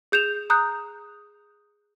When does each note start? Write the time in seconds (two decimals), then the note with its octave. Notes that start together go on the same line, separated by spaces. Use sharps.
0.12 G#4 G6 E7 F7
0.50 A#5 D#6 F#6 G6